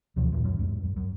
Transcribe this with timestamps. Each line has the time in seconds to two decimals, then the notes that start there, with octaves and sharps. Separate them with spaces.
0.16 D2 B2 E3 F3
0.32 D#2 A#2
0.44 F#2
0.59 E2 G#2
0.83 F#2
0.96 F#2